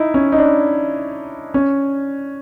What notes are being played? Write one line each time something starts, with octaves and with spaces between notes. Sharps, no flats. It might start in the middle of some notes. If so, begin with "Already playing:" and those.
Already playing: D#4 E4
C#4
D#4
D4
C#4